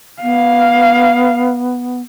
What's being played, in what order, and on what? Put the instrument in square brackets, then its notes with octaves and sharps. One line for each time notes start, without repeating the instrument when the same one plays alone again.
[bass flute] B3 [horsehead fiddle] F5